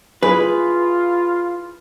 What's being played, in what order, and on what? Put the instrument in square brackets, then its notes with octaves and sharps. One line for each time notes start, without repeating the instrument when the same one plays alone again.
[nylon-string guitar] E4 G#4 [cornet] F4 [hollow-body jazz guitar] B4